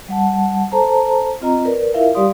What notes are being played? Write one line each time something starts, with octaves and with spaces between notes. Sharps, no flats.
G3 F#5 A5
A4 C5 A5 A#5
C4 F4 D#5 A#5
A#4 B4 D5
E4 F4 A#4 E5 F5
G3 G4 D5 F5 C6 D#6